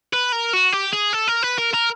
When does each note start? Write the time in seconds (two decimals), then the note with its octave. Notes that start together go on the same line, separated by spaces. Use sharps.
0.13 B4
0.32 A#4
0.53 F#4
0.72 G4
0.93 G#4
1.13 A4
1.28 A#4
1.43 B4
1.58 A#4
1.73 A#4